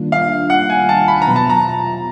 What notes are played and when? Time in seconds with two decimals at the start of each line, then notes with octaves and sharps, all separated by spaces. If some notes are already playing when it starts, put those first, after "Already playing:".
Already playing: D#3 G3 A#3 D4 F4
0.12 F5
0.50 F#5
0.70 G#5
0.89 A5
1.08 B5
1.22 A#5
1.27 B2 F#3 B3
1.36 A5
1.50 A#5